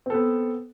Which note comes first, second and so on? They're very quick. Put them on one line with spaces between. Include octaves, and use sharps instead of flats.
C4 A4 B3